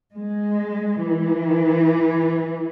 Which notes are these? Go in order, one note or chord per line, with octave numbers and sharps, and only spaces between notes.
G#3
E3